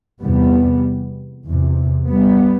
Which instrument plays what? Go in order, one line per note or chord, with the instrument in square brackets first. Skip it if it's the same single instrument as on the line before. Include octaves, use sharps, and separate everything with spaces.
[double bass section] E2 C3 G3 B3
E2
C3
G3 B3